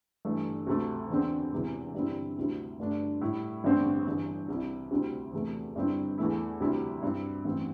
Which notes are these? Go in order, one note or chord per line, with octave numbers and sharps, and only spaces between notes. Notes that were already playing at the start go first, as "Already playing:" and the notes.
G1 G2 E3 A3
D2 C3 A3
E2 D3 C4
E1 E2 C3 E3
G2 D3 G3 C4 E4
D2 C3 G3 E4
G1 G2 D3 A3 D4
A2 G3 E4
A1 G2 D3 C4
G1 G2 E3
C2 C3 G3 E4
D2 C3 G3 C4 E4
E2 C3 A3
G1 G2 D3 C4 E4
E2 E3 A3 E4
D2 C3 G3 E4
G2 G3 C4 E4
A1 G2 E3 C4